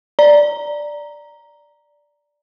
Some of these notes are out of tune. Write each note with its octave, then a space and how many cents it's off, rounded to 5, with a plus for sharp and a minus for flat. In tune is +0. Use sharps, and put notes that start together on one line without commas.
D5 +0 A#5 +0